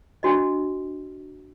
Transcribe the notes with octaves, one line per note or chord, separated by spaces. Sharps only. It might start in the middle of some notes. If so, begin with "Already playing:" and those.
D4 F#4 D#5